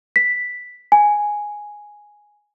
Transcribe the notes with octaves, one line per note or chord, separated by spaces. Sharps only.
B6
G#5